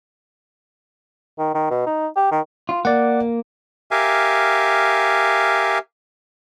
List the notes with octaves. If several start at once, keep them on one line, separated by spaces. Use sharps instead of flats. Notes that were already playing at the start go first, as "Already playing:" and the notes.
D#3
D#3
B2
D#4
G4
D#3
F4
A#3 D5 F#5
G4 A#4 E5 F5 G#5